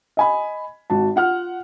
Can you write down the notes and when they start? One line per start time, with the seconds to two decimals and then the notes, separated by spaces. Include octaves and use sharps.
0.17 D#5 G#5 B5
0.90 G#1 F#4 A5
1.16 F4 F#5 F6